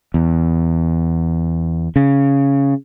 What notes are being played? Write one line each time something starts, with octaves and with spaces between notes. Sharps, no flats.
E2
C#3